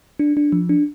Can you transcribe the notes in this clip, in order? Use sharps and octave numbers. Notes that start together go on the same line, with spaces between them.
D4
D4
F3
D4